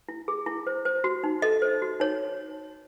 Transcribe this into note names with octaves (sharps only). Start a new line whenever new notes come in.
E4
G#4
E4
C5
C5
F#4
D#4
A4 D#5
C5
F#4
D#4 C#5